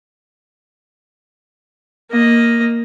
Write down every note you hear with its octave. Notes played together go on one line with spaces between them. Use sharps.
A#3 D#5